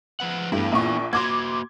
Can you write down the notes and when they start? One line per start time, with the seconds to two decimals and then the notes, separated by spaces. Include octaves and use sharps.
0.20 F3 B4 F#5
0.52 G2 A3 B3 E4
0.72 A#1 A#2 C#6
1.13 A#3 F#4 C6 D6 G#6